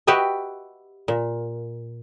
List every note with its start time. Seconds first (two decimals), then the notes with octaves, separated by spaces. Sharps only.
0.07 F#4 G4 B4 D#5 E5
1.08 A#2